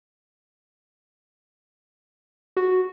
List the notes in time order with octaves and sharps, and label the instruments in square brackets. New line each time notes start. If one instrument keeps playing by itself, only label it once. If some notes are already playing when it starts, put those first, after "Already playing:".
[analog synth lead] F#4